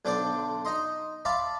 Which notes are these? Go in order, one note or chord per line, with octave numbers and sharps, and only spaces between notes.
B1 D3 D4 A4 C5 D5
D#4 D#5 C6
D5 E5 F5 A5 B5 C6